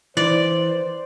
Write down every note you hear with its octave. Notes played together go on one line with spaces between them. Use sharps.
E3 C5 D5